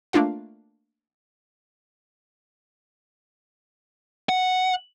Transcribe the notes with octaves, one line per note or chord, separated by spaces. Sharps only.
A3 A#3 D4 F4 F5
F#5